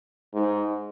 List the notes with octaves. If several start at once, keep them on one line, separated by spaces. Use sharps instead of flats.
G#2